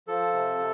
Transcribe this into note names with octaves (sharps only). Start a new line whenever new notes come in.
F3 A4
C3
C3